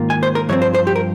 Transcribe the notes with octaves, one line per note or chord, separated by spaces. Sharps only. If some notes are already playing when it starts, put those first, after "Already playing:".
Already playing: G#2 D#3 A#3 F4
G#5
C5
A#4
G2 F3 C4 C#5
C5
C5
G4
A#4